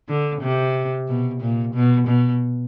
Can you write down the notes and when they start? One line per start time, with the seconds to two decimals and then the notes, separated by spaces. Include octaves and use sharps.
0.09 D3
0.42 C3
1.08 B2
1.41 A#2
1.74 B2
2.07 B2